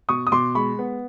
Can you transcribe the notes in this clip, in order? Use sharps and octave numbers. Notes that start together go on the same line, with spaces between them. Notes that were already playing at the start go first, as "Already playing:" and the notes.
B2 C#6 D#6
D#6
B2 C6 D6
G#3 B5 C#6
B3